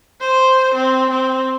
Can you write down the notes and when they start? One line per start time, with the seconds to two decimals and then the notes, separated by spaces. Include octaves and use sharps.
0.21 C5
0.74 C4
1.10 C4